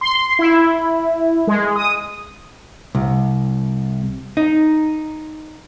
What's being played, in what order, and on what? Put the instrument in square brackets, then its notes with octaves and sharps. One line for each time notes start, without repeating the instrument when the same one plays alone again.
[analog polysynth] C6
E4
G#3
D#6
[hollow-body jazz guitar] C2
D#4